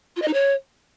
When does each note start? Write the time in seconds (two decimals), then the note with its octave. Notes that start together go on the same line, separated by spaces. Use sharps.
0.16 F4
0.22 D#5
0.28 D#4
0.33 C#5